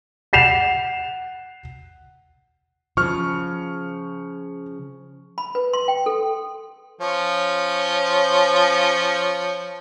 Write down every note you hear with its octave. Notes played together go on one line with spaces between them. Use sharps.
F#5 C7 E7 F7
C#3 F3 C#6 F6
B5
B4
C6
G5
A4
F3 C#4 C#5